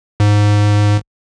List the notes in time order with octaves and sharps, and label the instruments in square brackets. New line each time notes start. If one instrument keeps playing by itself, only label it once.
[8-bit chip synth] G#2